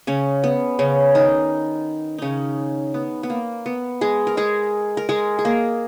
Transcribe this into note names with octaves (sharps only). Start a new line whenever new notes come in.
C#3 C#4
B3
C#3 C#4
D#3 D#4
C#3 C#4 D#4
B3
B3
A#3
B3
G#3 G#4
A#4
G#3 G#4
A#4
G#3 G#4
G#4
A#3 A#4